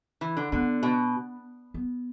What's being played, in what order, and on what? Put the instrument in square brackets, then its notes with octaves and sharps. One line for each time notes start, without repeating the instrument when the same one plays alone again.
[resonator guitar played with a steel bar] E3
D3
[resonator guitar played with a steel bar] D3 [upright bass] B3
[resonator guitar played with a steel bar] B2
[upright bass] B3